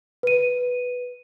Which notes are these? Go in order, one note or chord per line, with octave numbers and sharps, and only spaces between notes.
B4 D#7